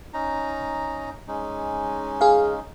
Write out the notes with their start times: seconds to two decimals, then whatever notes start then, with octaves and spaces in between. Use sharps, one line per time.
0.14 C#4 D#4 A#5
1.28 G#3 C#4 D#4
2.21 G#4 F5